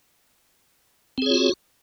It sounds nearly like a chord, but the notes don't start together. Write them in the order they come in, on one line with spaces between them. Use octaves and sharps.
C4 G#4 C#5 F4 F#4